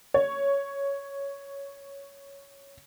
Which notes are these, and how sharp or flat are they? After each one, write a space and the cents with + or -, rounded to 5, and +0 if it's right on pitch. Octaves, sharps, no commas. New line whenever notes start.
C#5 +5